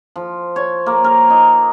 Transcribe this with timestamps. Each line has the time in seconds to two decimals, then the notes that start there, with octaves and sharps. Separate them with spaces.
0.16 F3
0.56 C#5
0.86 A#3
1.04 A#4
1.30 D#4